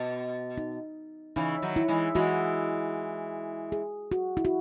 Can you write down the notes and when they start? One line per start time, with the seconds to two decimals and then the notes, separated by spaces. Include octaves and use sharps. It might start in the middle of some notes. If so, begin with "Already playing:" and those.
Already playing: B2
0.58 D#4
1.36 C#3 E3 D#4
1.62 D#3 F#3
1.76 E4
1.88 E3 G#3
2.15 E3 G#3 F#4
3.72 G#4
4.12 F#4
4.37 E4
4.45 F#4